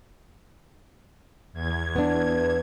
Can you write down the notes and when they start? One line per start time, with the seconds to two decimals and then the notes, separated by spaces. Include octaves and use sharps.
1.53 E2 G#6
1.96 B3 D4